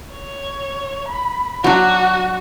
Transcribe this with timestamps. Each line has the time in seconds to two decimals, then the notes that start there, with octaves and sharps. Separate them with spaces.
0.13 C#5
1.08 B5
1.64 F#3 D4 F#4